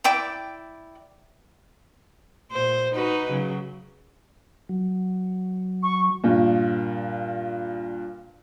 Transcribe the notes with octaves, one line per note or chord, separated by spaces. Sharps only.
E4 D5 G5 D6
A#2 C5
D#4 F#4 B4
C#3 F#3
F#3
C#6
G2 A#2